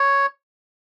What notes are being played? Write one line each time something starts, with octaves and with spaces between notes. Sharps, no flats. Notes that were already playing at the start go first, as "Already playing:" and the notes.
Already playing: C#5